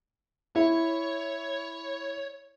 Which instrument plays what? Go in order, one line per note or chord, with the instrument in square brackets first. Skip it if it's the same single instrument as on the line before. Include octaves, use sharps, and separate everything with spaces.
[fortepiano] E4 [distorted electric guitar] C#5